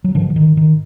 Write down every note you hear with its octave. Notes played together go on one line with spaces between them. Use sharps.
F#3
G#2 D3 F3
F3
D#3
D#3